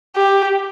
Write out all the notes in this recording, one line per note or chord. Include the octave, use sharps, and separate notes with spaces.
G4